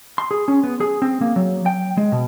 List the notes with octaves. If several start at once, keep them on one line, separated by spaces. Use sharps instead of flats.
C6
G#4
C#4
B3
G#4
C4
A#3
F#3
G5
G#3
B2